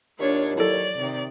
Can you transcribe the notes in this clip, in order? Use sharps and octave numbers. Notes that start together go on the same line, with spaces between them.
D#2 D4 F4 C#5
F#3 E4 A4 C#5 D5
C3 D#3